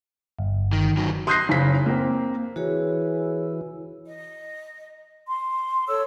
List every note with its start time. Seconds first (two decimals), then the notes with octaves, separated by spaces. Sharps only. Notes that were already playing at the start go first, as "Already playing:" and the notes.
0.39 G1
0.73 D#3
0.97 D#3 F#3
1.27 C6 D#6 F#6 G6 A#6 C7
1.49 F#1 C#3 B6
1.86 A#3 C4
2.56 E3 F#4 G#4 C#5
4.06 D#5
5.27 C6
5.87 A4 C#5 E6